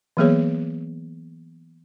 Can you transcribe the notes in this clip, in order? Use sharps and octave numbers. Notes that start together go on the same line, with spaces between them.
E3 F#3 A#3 B3 G#4 C#5